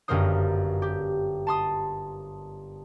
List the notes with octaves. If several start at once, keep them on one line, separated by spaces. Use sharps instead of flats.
G1 F#2 A#3 A#4 C5 D#6
G4
A5 C6 D#6